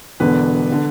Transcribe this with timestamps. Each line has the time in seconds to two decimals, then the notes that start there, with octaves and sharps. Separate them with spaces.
0.20 E1 E2 D3 B4
0.72 D3